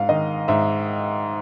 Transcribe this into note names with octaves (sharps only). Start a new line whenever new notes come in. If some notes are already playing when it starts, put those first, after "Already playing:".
Already playing: G#2 F5
D#3 D#5
G#2 E5